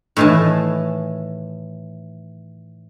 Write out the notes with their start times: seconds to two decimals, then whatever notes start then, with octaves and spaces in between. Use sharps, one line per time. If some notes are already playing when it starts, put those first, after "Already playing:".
0.17 A2 D#3 E3 G#5 A5